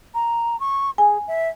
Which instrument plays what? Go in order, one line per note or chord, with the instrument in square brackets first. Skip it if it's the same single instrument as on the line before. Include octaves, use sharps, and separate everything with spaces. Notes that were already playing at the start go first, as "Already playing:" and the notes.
[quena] A#5
C#6
[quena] G#4 [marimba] G#5
[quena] E5